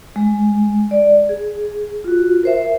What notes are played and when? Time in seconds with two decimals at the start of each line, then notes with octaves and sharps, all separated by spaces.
0.16 G#3
0.91 D5
1.29 G#4
2.04 F4 F#4
2.43 A#4 C5 E5